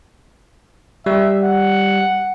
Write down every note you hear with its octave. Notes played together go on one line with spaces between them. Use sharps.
G3 E5
F#5